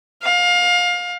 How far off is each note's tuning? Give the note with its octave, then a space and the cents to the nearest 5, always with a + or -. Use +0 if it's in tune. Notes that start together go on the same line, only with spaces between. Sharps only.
F5 +25